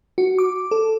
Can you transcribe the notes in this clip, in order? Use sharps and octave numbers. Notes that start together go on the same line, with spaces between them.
F#4
D6
A4